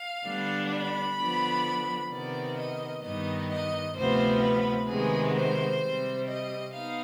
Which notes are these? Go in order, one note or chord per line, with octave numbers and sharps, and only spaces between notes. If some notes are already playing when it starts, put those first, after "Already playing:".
Already playing: F5
D3 G3 B3 D4
B5
D3 F3 B3 D4
C3 D#3 B3 D5
D#5
G2 D#3 G3 B3 D#4 D#5
D#5
D2 C3 F3 B3 C5
B4
C3 D#3 G#3 B3 G#4
C5
C3 G3 C4
D#5
B3 D#4 F5